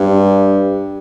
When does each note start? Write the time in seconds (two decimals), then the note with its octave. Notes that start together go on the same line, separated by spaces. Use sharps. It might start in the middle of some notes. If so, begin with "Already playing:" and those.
Already playing: G2